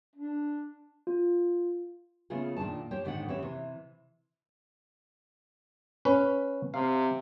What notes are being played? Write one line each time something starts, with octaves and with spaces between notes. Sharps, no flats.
D4
F4
C#3 A3 B3 F4 G#4
A#2 D#3 D4 F4 A5
G4 C5 C#5 G5
G#2 D3 D#3 B4 F#5
E3 C#4 G4 C#5 E5
C3 E3
C#4 B4
C3 F5